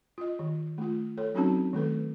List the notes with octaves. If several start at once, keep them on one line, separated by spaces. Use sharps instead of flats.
F4 D#5
D#3
A3 F4
A4 C#5
F#3 C4 C#4 D#4 F#4 A5
D#3 A3 A4 B4